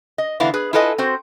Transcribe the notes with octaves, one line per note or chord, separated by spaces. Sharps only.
D#5
D3 E3 B3 E4 F5
G#4 B4
E4 F4 A4 B4 D#5 G#5
C4 F#4 C5